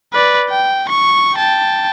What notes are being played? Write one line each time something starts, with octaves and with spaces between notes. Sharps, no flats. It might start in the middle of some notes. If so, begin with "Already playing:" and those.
B4 D5
G5
C#6
G5 A5